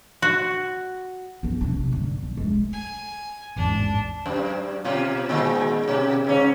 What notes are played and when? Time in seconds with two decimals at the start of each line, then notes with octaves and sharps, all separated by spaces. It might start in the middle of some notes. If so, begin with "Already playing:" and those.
0.22 F#4
1.43 B3 D4
1.61 C3 D4
1.91 G2 D3
2.22 B1
2.37 G#3 A3
2.73 G#5
3.56 A1 E2 G#2 D4
4.26 F#2
4.84 B2 F4
5.29 A#2 D#3 G#3
5.88 B2
6.24 G#2 C#3 C#4